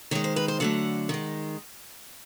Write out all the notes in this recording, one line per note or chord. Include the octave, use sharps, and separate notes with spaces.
D#3 G#3 C#5
C5
B4
C5
D3 F#3 A3 F#5
D#3 G#3